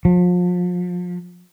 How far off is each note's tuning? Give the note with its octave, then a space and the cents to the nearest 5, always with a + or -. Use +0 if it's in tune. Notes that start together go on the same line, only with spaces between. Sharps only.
F3 +35